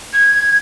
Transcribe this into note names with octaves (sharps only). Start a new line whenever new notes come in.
G#6